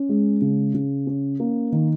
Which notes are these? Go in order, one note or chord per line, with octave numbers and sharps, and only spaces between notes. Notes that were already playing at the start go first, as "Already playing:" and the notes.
Already playing: C#4
G#3
C#3
C#3
C#4
A#3
D#3